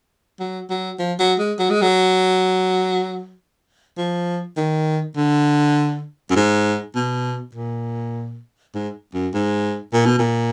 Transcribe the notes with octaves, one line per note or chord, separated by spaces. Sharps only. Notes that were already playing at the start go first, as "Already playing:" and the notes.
F#3
F#3
F3
F#3
G#3
F#3
G#3
F#3
F3
D#3
D3
F#2
G#2
B2
A#2
G#2
F#2
G#2
A#2
B2
A#2